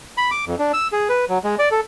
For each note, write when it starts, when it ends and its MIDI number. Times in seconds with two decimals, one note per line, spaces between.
0.17 0.31 83
0.31 0.45 86
0.47 0.55 41
0.59 0.72 62
0.73 0.88 88
0.92 1.08 68
1.09 1.25 71
1.29 1.38 54
1.44 1.55 56
1.59 1.69 74
1.71 1.80 69